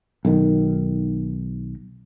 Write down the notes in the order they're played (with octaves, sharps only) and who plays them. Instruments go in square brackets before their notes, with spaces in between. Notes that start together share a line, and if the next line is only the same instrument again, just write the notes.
[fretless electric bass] B1 D#3